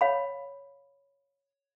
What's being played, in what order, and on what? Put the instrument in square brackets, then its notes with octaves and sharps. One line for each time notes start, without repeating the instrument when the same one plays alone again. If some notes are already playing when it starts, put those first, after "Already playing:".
[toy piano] C#5 F5 B5